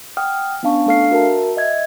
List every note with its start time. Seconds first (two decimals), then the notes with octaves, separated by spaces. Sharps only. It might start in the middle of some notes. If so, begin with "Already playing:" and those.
0.17 F#5 G5 D#6 F6
0.63 B3 C#4 D4 F5 A5 C#6
0.86 A3 D4 A4 F5 F6 C7
1.11 F#4 A#4 E5 A5
1.57 D#5 E5 G#6